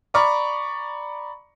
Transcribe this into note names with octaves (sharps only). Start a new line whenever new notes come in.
D5 A#5 B5 C#6 D6